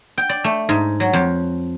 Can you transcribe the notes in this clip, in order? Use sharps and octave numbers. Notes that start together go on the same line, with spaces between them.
G5
D5
A3
G#2
F#3
F2